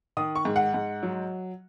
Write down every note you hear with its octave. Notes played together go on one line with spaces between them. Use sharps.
D#3 D#6
C#6
G#2
F#5
G#2
F#3